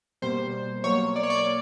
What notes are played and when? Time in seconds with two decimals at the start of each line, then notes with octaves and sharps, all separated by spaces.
0.22 B2 G3 A#3 C5
0.84 B2 F#3 A#3 C#5
1.16 D5
1.23 C#5
1.30 D5
1.46 A#3